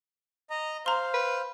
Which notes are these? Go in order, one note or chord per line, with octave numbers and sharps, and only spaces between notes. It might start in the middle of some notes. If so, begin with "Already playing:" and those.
D#5 A#5
C5 F5 A#5 C6
B4